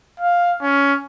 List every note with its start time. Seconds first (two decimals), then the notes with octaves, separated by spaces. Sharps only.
0.20 F5
0.61 C#4